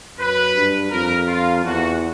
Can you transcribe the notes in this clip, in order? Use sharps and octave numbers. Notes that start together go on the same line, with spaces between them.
F#2 B4
G2
F2 A#4
F4
E2 F#4